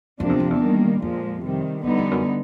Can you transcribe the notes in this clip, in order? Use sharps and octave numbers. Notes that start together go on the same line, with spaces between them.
F2 C3 F3 A#3 D4
E2
F2
E2
D#3 G3 A#3
F2 A#2 F3 G#3
C3 D#3 G3
E2 D3 G3 B3 D#4
F2
F#2